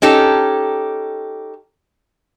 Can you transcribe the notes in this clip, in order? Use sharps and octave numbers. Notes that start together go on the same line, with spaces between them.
C#4 D#4 G4 A4